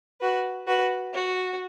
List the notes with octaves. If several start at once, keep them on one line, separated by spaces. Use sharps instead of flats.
F#4 B4
F#4 B4
F#4